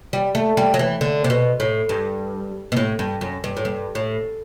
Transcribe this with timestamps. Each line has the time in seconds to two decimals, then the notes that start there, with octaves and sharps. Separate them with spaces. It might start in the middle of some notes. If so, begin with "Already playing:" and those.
0.13 G3
0.35 A3
0.57 G3
0.74 F#3
0.79 E3
1.01 D3
1.24 C3
1.30 B2
1.60 A2
1.89 G2
2.72 B2
2.77 A2
2.99 G2
3.21 F#2
3.44 G2
3.57 A2
3.65 G2
3.95 A2